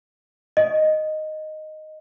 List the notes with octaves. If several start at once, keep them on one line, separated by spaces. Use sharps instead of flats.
D#5